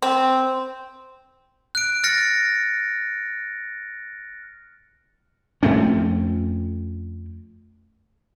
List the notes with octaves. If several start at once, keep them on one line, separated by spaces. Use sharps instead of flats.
C4
F#6 D7
F6 A6 A#6 C#7
F2 A3 C4 C#4